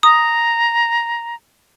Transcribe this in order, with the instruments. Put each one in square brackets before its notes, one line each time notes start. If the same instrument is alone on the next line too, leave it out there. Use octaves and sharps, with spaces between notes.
[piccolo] A#5 [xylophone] D#6